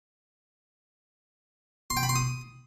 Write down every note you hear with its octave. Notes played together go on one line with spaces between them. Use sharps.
C6
G5
B5
C6
D#6